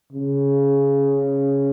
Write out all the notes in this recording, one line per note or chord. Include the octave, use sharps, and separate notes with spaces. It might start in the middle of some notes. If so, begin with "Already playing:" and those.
C#3